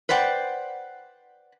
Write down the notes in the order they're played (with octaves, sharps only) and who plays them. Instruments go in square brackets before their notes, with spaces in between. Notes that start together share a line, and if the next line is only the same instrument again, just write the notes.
[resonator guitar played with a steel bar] B4 C5 D5 F#5 G5